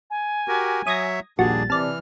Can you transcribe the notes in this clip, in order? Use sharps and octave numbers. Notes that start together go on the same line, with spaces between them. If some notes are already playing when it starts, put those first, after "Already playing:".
G#5
F#4 G4 A#4
F#3 C#5 E5 D#6 G#6 A#6
A#1 D#2 A#2 G3 D4 F#4 G#4 A6
C3 E3 D5 A5 F6